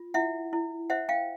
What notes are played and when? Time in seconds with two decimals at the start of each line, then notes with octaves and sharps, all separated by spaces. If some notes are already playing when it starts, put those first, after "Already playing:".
Already playing: F4
0.14 E4 E5 F#5
0.53 E4
0.90 C5 E5 F#5
1.09 F5 G5